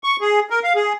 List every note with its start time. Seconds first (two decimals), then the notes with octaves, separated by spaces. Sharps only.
0.04 C#6
0.21 G#4
0.50 A#4
0.64 F5
0.75 G#4